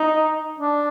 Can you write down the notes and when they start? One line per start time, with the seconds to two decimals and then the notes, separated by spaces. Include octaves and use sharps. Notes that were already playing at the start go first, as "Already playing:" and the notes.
Already playing: D#4
0.60 D4